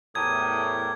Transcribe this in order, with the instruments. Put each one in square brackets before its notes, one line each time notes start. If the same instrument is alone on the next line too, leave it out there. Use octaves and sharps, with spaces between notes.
[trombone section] E2 A2 [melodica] G4 A4 A#4 [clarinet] D#6 [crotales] G#6